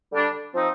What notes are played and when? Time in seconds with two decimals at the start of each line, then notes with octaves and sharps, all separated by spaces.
0.13 D3 G3 D4
0.54 F3 C4 D#4